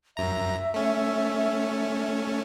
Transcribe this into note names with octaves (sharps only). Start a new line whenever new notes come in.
F#2 E5 A#5
A3 C#4